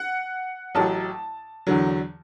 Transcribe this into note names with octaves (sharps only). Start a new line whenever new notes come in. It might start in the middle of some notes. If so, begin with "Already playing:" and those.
Already playing: F#5
A1 A2 F#3 A5
E2 D3 F#3